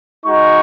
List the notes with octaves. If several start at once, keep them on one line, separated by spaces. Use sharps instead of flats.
G#3 D#4 F#4 C#6